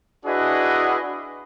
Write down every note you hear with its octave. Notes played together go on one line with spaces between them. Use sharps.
D4 E4 F#4 G#4 B4 D#5